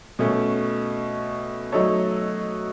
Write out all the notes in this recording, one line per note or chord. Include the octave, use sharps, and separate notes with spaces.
B2 A3 C#4
F#3 A3 D#4 A4 C#5